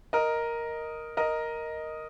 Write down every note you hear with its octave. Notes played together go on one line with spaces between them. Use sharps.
A#4 D#5
A#4 D#5